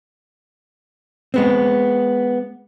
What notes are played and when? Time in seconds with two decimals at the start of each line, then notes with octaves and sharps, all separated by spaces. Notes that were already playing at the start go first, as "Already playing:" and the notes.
1.34 G#3 B3 C4